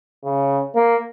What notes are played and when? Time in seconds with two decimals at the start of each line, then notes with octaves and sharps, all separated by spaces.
0.24 C#3
0.75 A#3